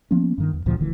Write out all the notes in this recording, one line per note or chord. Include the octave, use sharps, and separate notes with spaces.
F3 A#3 B3 C#4
G2 D#3
E2
D2 A#2 C#3 F3
D#1 D2 D#3 E3